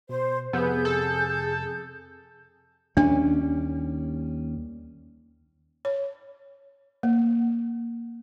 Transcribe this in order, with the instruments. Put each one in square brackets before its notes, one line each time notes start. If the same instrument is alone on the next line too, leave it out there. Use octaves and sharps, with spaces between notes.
[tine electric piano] B2 [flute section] C5
[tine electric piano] F2 C3 E6 [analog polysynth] B3 [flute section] G#4 G6
[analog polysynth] A4
[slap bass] D#2 G3 C#4 [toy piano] D4
[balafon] C#5
A#3